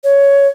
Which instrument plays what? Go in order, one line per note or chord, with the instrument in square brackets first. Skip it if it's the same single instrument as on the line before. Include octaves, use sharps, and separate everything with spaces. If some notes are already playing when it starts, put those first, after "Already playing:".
[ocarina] C#5